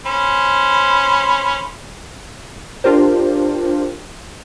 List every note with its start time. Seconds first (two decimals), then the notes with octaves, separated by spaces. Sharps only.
0.06 C#4 C5 B5
2.84 D4 F4 G4 A#4 C5